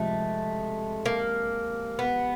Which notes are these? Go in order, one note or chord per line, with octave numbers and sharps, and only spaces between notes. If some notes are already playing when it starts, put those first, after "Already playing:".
Already playing: C3 F3 G#3 A3
A#3
B3